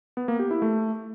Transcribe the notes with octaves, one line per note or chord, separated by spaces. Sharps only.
B3
A#3
G4
E4
A3